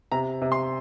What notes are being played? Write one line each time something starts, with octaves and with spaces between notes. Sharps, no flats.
C3 A#5
C3
C6